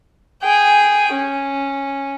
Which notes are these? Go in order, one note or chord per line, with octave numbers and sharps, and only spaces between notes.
G#4 G5
C#4